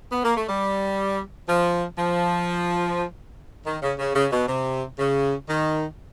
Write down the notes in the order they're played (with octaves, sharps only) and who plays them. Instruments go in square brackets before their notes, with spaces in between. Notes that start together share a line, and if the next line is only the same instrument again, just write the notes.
[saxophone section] B3
A#3
A3
G3
F3
F3
D#3
C#3
C#3
C#3
B2
C3
C#3
D#3